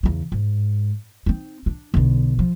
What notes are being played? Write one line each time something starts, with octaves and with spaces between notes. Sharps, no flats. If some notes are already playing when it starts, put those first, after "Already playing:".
E2 C#3
G#2
C4 D#4
D4
B1 D3
F3